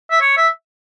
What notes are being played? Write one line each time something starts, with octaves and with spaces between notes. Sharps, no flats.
E5
C#5
E5